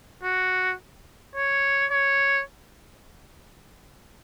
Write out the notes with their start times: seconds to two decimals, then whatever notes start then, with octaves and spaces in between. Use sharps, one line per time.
0.23 F#4
1.35 C#5
1.91 C#5